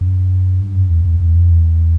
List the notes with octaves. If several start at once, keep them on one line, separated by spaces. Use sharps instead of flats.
F#2
G2
F#2
E2
E2
E2
F2
E2